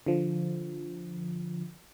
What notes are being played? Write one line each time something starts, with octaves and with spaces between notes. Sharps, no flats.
D3 F3